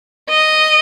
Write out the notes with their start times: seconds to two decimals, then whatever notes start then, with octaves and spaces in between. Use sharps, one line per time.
0.30 D#5